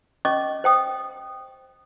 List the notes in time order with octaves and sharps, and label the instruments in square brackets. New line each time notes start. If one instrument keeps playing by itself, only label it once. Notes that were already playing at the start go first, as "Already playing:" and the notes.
[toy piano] C#4 D#5 C#6 D6
C5 G5 D#6